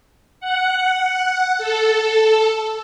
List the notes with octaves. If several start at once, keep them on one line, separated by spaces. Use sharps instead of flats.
F#5
A4